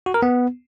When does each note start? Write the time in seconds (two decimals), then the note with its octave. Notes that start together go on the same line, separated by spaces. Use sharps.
0.06 F#4
0.14 A#4
0.22 B3